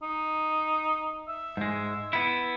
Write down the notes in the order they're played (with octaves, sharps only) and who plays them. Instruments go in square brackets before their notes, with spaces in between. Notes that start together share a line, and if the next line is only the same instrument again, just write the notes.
[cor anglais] D#4
E5
[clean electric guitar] G#2 G#3
B3 E4